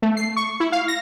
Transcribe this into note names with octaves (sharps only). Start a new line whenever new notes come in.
A3
C7
C#6
E4
F5
A#6